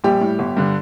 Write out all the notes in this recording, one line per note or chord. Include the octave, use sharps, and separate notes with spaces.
A#1 G3 G4
A2
G1
G2 D3